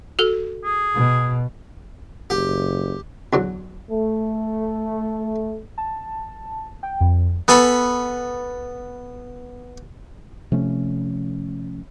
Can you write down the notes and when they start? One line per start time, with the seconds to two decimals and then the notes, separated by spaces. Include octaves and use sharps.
0.19 F#4 A4
0.64 G#4
0.95 B2
2.30 F#1 G4
3.33 E2 D3 F#3
3.91 A3
5.78 A5
6.83 G5
7.00 F2
7.48 B3 A4 G#5 A5 B5
10.52 C3 F3 A3 C#4